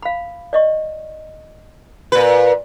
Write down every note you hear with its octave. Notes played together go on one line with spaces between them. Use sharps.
F5 B5
D5 D#5 C#6
A#2 B4